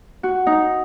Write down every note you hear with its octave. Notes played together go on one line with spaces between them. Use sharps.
F#4
D#4